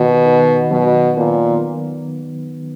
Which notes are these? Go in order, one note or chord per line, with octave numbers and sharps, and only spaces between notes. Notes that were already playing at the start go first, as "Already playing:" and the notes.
Already playing: B2 D#3
D#3
B2 F#3
A#2 B3